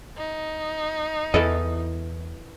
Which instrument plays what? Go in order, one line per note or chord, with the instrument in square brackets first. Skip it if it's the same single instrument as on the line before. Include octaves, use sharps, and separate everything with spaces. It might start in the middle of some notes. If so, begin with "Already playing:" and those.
[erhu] D#4
[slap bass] E2 [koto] E3 A4 [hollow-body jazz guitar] D#5